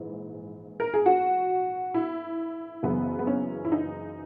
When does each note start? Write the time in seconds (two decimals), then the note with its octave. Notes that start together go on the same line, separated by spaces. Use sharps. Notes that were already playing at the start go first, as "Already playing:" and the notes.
Already playing: A#1 G#2 E3
0.80 A#4
0.94 G#4
1.06 F#4
1.94 E4
2.83 F#1 F#2 C#3 E3 B3
3.19 B3
3.27 C#4
3.65 E4
3.72 D#4